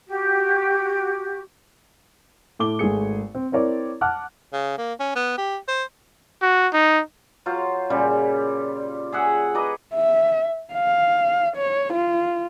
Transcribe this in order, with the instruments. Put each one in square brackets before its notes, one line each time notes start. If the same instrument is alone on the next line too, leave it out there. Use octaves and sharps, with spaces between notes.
[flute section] F#4 G4
[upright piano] A2 A4 D6 G7
G#1 A3 G#4 C#7
C4
C4 E4 A#4 C#5 D5
F#5 A5 D6 F6 F#6
[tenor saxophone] C#3
A#3
C#4
B3
G4
C5
[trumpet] F#4
D#4
[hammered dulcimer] F#3 F4 C5 F5
A#2 C#3 G3
G#4 E5 F#5
B4 D#5 A#5 D6
[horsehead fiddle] E5
F5
C#5
F4